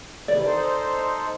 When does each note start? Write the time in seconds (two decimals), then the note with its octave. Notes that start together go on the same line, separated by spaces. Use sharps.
0.28 C3 D#3 E3 D5
0.45 D#4 A4 C5